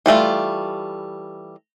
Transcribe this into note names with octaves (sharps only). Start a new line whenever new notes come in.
E3 G3 A3 F4